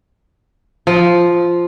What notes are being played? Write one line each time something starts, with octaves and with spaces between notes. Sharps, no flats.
F3